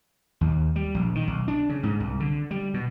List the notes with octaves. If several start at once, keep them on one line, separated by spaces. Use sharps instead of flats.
D#2
G3
A#1
D#3
B1
D4
C#3
G#2
C2
D3
G3
B2